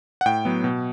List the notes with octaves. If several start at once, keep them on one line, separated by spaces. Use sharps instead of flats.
F#5
A2 G5
F#3 B3
B2